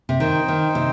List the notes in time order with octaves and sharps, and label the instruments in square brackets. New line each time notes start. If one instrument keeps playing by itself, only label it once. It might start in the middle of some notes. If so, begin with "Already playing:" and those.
[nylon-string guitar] C3
[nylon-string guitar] D#3 [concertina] D#4 C5 G5
[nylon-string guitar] D#3
C3